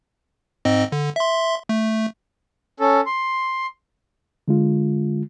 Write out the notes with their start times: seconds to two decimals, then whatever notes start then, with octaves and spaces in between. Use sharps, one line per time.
0.65 G#2 C4 D#5
0.92 D3
1.16 E5 C6
1.69 A3
2.80 C#4 A4
3.06 C6
4.48 D3 G#3 F4